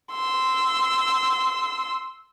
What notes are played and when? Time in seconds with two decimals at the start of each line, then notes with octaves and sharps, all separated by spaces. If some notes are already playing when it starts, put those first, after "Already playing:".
0.12 C6 E6